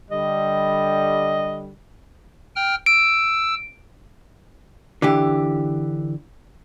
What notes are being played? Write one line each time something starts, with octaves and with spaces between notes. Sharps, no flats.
D3 G3 D#5
G5 F6
E6 D7
D3 E3 G4